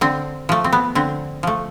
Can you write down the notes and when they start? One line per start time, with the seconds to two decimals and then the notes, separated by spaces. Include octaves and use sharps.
0.01 D3 C4
0.49 F3 A3
0.64 C4
0.73 B3
0.95 D3 C4
1.43 F3 A3